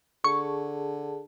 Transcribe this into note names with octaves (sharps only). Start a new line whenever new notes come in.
D3 G#4 A5 C#6